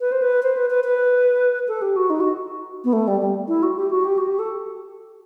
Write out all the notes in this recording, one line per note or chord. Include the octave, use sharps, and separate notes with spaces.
B4
C5
B4
C5
B4
B4
B4
A4
G4
F#4
D#4
F#4
B3
A3
G3
G3
E4
F#4
G4
F#4
G4
F#4
G4
A4